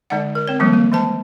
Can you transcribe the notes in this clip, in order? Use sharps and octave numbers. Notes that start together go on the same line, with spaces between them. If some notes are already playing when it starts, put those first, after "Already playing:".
D3 G#3 D#4 D5 F#5
A#4
C4 C#5
D#3 F3 G3 G#3 A#3
A#3
E3 G#3 C5 A5